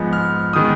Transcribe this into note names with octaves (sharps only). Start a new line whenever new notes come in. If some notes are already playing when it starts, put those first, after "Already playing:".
Already playing: G#2 F3 G#3 B3
F6
D#3 G#3 B3 D#6